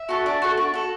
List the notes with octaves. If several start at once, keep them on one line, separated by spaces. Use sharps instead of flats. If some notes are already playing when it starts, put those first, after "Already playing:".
Already playing: E5
F#4 A4
D4
F#4 A4
D4
F#4 A4